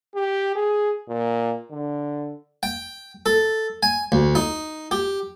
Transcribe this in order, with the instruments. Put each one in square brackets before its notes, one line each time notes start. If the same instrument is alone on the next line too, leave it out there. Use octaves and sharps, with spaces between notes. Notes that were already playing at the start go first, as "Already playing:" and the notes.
[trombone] G4
G#4
A#2
D3
[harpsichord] G5
A4
G#5
D2
D#4
G4